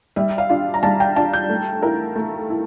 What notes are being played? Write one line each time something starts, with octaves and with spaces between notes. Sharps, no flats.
G3 E5
F5
D4 F4
A#5
G3 A5
G5
D4 F4 A5
G6
A3
E4 A#4
A3
E4